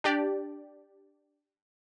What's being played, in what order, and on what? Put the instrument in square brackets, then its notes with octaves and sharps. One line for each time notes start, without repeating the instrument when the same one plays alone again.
[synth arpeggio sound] D4 G4 D5